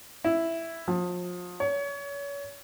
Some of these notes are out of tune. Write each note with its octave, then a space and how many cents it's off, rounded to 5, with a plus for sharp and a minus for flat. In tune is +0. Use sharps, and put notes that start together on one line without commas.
E4 +5
F3 +30
C#5 +30